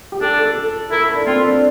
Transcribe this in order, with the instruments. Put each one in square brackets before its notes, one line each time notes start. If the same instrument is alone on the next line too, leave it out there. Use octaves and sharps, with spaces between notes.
[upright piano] G4
[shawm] D4 [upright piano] A4
[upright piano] A4
A4
A4
[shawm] E4 [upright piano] A#4
[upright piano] A4
D4
[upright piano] C4 [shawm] F4
[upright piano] D4